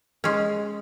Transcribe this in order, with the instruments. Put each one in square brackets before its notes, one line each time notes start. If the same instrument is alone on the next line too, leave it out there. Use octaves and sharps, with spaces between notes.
[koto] G#3 C#4